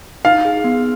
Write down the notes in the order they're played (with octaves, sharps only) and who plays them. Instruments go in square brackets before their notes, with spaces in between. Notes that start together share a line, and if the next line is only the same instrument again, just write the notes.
[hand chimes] D#4 [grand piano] F5
[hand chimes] G#4
B3